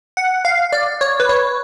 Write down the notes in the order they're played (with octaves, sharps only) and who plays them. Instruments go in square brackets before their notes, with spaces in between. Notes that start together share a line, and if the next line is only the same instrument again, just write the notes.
[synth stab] F#5
F5
D5
C#5
B4
C#5